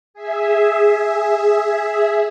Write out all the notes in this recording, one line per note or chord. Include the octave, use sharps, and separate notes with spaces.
G#4 E5